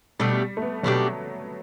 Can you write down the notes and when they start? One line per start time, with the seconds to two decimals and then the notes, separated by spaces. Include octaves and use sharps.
0.19 B2 G3 A3 D4 G4
0.57 A3
0.62 B3
0.83 B2 F#3 A3 D4 G4